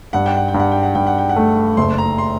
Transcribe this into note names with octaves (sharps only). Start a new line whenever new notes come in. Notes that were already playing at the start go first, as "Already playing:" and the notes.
G2 F#5
G5
F#5
G5
G2
F#5
G5
F#5
G2 G5
F#5
G5
F#5
A3
F#1 C6
A#5
C6